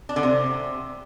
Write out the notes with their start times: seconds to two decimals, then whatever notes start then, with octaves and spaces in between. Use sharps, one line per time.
0.09 D4
0.16 D3
0.23 C3